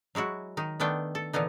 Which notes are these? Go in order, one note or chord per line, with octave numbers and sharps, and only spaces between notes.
F#3 G#3 E4 F#4
D#3 D#4
D#3 A3 B3 D4 G5
A4
A#2 D3 E3 B3 D#4